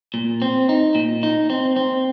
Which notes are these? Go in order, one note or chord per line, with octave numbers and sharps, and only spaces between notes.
A#2
C4
D#4
A#2
D#4
C4
C4